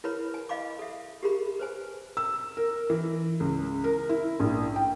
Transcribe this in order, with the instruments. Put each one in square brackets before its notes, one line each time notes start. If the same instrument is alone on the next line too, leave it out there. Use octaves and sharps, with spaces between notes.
[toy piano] E4 A#4 B4 C#5 B5
G#5
D#5 F5 B5 D6
A4 E5
G4 G#4 A#4 B5
B4 C5 G#5
[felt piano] E6
A#4
E3
C#2
A#4
E4
A#1
G5